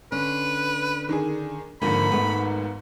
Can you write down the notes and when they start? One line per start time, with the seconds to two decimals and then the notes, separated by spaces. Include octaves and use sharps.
0.12 D3 C#4 B4
1.09 D#3 D4 G#4
1.82 G#1 G#2 D3 F3 A#3 B5
2.12 A3 B3